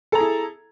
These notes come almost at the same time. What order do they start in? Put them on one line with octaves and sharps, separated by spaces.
A4 A#5 G#4 E4